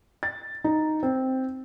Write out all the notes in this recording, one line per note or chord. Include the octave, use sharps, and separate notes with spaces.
A6
D#4
C4